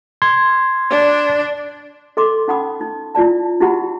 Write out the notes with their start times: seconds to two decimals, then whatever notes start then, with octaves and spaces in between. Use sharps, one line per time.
0.22 C6 G#6
0.90 D4
2.17 A4 D#5 C6 D6
2.48 C#4 D#4 F#5 B5 D#6
2.81 D#4
3.15 E4 F4 D5 A5
3.60 D#4 E4 F#4 G4 F#5 B5